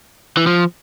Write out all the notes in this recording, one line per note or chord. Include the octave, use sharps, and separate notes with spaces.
E3
F3